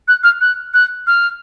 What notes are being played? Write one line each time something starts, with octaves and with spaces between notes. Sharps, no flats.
F#6
F6
F#6
F#6
F6